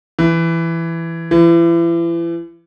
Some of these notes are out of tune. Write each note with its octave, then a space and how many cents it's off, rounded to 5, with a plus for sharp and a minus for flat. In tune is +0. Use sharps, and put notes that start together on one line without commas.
E3 +10
E3 +35